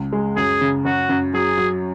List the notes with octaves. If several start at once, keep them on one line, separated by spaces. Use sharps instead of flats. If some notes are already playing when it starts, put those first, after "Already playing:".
Already playing: C#2
G#3
F#2 G#4
C#3
F#2 F#4
F#2
F#3 G#4
F#3